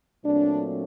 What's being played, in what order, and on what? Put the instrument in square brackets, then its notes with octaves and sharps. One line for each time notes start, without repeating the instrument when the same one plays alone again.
[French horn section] A#2 F#3 A3 C4 D4